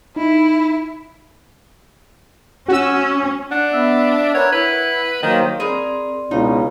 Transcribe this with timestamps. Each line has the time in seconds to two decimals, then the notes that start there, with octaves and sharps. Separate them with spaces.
0.16 D#4 E4
2.68 C#4 F#4 E6
3.51 D4 F#5
3.73 B3 E5
4.35 A#4 B4 C#5 F#5
4.52 E4 B4 F#5
5.23 D#3 F#3 A#3 D#4 C5
5.60 C4 G#4 A#4 D5 B5 C6 D#7
6.31 C#2 B2 D#4 E4 C#5 F5